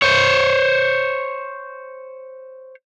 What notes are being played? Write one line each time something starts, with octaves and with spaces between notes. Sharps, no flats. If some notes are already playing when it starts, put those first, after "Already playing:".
C5 C#5